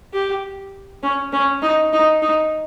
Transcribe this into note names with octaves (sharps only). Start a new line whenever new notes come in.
G4
C#4
C#4
D#4
D#4
D#4